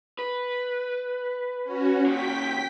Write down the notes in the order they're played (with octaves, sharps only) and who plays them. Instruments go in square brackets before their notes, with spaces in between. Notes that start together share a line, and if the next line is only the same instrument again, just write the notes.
[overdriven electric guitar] B4
[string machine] C#4 F#4
[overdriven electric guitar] A#2 F#3 [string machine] G5 B6